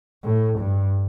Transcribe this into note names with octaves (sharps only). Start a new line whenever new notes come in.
A2
G2